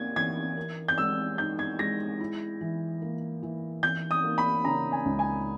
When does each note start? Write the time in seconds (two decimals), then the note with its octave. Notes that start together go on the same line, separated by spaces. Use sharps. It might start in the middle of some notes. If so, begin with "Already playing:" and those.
Already playing: A#3 D#4 G#6
0.16 E3 G#6
0.57 A#4
0.88 G6
0.98 G#3 E6
1.38 D#4 G6
1.59 G#6
1.79 G#3 A#6
2.20 E4
2.61 E3
3.02 A#3
3.43 E3
3.83 E3 G6
4.11 D#6
4.24 A#3
4.38 B5
4.65 C#3 A#5
4.92 G#5
5.05 C#2
5.19 G#5